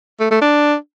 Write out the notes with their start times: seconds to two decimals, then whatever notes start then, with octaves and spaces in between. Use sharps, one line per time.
0.20 A3
0.31 A3
0.42 D4